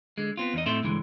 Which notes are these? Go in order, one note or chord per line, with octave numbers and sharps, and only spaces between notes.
D3 G#3
B3 C4 F4
E2 D#4 D#5
A2 C4 A4 E5 C6
C#2 G2 D3 E3 G#3